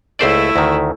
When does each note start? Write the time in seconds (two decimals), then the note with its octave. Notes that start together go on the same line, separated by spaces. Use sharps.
0.19 C#2 A3 E4 C5 D5
0.56 D2 D#3